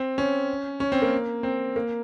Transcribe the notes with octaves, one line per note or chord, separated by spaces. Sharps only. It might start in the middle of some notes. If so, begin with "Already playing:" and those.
Already playing: C4
C#4
C#4
C4
A#3
C4
A#3